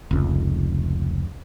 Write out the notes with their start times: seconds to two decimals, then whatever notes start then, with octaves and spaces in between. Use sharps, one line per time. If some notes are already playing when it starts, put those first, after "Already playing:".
0.11 F1 C#2